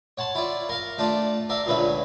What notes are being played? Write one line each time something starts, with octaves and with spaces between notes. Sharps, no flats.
C#5 F#5 A5 C6
E4 F4 D5
A#4 F5
A3 D4 F4 D5
A#4 D5 E5 F5
C#2 A#2 D3 B4 C#5 E5